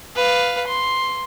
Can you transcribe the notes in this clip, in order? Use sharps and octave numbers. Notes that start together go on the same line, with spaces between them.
B4 F5
C6